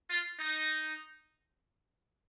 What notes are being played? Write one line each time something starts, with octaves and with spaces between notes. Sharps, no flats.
F4
D#4